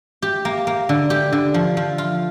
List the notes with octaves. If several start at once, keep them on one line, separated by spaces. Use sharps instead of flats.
G4
A#3
A#3
D3
G4
D3
F3
F3
F4